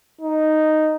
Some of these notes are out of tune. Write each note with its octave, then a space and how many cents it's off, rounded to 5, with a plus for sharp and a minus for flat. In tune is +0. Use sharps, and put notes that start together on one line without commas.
D#4 -5